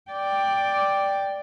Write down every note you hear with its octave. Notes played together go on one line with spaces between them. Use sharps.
D5 G5